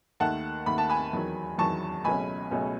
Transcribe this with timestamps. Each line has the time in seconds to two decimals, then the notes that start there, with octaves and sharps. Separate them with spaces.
0.20 D#2 D#3 A3 F#5 A5
0.66 D#2 D#3 A3 B5
0.78 A5
0.90 G#5 B5
1.13 E2 D#3 F#3
1.58 E2 D#3 F#3 A5 C#6
2.04 C#2 B2 F#3 A3 C#4 G#5 B5
2.51 C#2 B2 F#3 A3 C#4